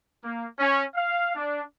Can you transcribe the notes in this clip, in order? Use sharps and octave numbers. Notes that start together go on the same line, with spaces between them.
A#3
C#4
F5
D4